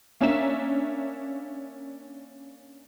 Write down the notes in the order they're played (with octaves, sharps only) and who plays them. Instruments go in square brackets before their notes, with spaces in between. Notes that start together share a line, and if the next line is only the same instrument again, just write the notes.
[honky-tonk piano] A#3 C#4 D4 E5 A#5 E7